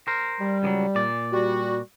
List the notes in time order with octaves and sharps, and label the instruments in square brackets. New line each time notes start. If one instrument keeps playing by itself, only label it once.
[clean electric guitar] A#4 C5
[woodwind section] G3
[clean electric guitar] C#2 F3 F#3
A#2 D5
[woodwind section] G3 F#4